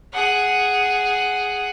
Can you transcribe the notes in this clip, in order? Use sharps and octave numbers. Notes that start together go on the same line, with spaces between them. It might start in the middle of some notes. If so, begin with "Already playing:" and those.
G#4 F#5